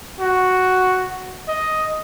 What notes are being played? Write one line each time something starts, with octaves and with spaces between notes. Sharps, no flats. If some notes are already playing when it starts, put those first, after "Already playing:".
F#4
D#5